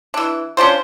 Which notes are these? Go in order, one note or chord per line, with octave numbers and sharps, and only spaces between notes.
E3 D4
C#4 D4 F4 C5